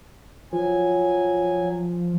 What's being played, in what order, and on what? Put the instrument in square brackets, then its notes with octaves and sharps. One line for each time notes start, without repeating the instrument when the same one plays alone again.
[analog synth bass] F3 [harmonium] F#3 G#5